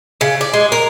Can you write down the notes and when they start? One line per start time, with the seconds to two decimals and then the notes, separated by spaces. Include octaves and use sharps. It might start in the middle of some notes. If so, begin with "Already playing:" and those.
0.21 C#3
0.41 D5
0.54 G#3
0.72 A#4